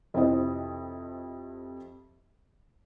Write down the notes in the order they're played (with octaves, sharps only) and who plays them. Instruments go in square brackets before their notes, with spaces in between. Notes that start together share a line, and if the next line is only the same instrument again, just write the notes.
[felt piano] F2 C3 E3 C5 D#5